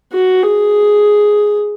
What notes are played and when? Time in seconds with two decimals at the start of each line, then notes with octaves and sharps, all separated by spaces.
0.13 F#4
0.43 G#4